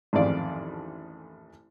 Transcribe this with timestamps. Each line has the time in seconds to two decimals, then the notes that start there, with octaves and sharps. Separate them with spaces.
0.13 A1 F2 G#2 D#3 D5 F5